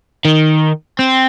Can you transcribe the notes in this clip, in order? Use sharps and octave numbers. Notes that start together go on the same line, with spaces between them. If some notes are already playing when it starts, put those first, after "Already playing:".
D#3
C4